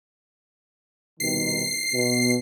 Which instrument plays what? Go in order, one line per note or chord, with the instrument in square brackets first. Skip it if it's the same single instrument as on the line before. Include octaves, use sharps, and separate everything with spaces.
[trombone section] C2 B2 D#3 [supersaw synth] C7
[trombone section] B2